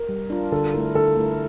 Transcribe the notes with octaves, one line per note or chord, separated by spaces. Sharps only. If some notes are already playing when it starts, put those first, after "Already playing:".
Already playing: A#4
G3
D4 F4 A#4
D3 A4
A3 E4 A#4
D3 A4
A3 E4 A#4